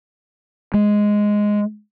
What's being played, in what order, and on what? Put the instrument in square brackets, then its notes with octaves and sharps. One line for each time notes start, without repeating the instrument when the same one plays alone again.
[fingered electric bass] G#3